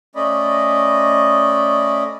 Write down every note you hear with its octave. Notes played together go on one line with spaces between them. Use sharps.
A3 C#4 D5 D#5 B5